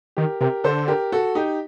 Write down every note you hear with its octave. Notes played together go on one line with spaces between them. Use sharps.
D#3 G4 A#4
C3 G4 A#4
D3 A4 C5
G4 A#4
F#4 A4
D#4 G4